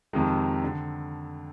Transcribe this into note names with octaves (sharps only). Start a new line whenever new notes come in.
F2 C3 D#3 G#3
D3